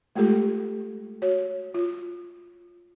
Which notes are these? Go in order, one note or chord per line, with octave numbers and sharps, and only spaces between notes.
G#3 A3 F4 G4 A4
F#4 C#5
F4